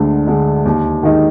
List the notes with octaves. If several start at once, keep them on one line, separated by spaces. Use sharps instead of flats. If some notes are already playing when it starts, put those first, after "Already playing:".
Already playing: D2 D3 G#3
D3 G#3
D#2
D#3 G#3 D#4